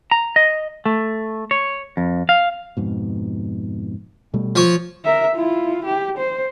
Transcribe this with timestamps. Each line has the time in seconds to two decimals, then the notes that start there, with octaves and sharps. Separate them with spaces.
0.11 A#5
0.36 D#5
0.86 A3
1.51 C#5
1.97 F2
2.29 F5
2.77 F2 G#2 B2
4.34 B2 G3 A3
4.56 F3 C#5
5.05 A#4 E5
5.36 E4 F4
5.85 G4
6.18 C5